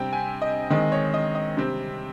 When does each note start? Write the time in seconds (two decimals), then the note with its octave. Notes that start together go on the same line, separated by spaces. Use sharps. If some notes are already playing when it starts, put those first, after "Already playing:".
Already playing: C3 G3 C4 G5
0.13 G#5
0.42 D#5
0.70 D#3 G#3 C4 D#5
0.92 C#5
1.14 D#5
1.35 D#5
1.57 C3 G3 C4